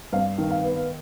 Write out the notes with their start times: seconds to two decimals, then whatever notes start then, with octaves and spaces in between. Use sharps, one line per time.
0.13 G2 F5
0.38 D#3
0.50 F5
0.64 B3